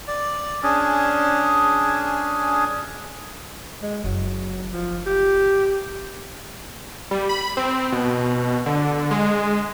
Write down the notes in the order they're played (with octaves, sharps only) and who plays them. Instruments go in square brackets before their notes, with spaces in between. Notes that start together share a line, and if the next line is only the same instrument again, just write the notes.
[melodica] D5
C#4 D4 G#4
[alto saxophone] G#3
[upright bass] F#1 [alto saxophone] F#3
[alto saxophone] F3
G4
[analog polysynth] G3
B5
C4
B2
D3
G#3